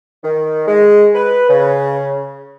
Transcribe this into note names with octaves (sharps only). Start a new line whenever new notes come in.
D#3
G#3
B4
C#3